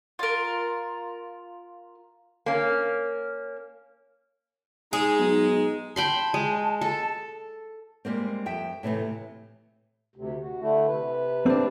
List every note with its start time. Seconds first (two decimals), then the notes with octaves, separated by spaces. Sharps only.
0.19 F4 A#4
2.46 A#3 C#4
4.93 G#3 D#4 G#4
5.19 B1
5.96 G5 A5 B5 C6
6.34 G#3
6.81 A4
8.05 G3 G#3 A#3 C4
8.46 F2 E5 G5
8.83 A2 C3 E3 A3
10.16 D2 C3
10.41 F#4
10.61 D3 A3 E4
10.87 C3 B4
11.46 C4 D4